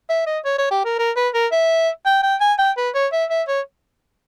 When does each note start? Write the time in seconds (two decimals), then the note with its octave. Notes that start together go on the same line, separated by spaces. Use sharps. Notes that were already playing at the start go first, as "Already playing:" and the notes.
0.09 E5
0.26 D#5
0.45 C#5
0.58 C#5
0.71 G4
0.85 A#4
0.99 A#4
1.16 B4
1.34 A#4
1.52 E5
2.06 G5
2.23 G5
2.41 G#5
2.58 G5
2.77 B4
2.95 C#5
3.12 E5
3.30 E5
3.48 C#5